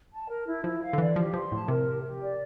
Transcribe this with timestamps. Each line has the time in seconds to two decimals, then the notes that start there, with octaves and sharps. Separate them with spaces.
0.11 A5
0.28 A#4
0.46 E4
0.63 F3 E4
0.81 F5
0.93 D3
0.98 E3 D5
1.16 F3 G4
1.34 F3 C6
1.51 A2 A5
1.68 C3 A#4
1.86 G4
2.04 G4
2.21 D5